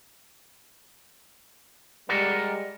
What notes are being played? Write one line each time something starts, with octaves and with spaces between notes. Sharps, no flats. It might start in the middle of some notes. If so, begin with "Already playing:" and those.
G3 G#3 A#4 D5 F#5